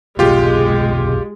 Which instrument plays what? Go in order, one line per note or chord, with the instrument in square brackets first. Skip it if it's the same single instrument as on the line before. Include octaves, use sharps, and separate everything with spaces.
[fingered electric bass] F1 B1 B2 [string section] G#3 [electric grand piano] F4 G4